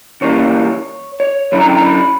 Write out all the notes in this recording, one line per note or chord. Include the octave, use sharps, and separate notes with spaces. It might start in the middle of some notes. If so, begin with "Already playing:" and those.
C#3 E3 G3 A#3 C#4 C#5
C#5
D3 F#3 C#4 E4 B5
A#5
G5
A#5
B5